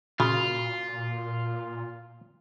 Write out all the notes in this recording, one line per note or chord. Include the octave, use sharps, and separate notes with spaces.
A#2 C#3 F4 F#4